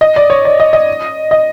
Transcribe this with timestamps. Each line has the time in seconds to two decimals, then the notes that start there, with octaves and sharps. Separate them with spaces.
0.01 D#5
0.16 D5
0.30 C#5
0.45 D5
0.60 D#5
0.73 D#5
1.31 D#5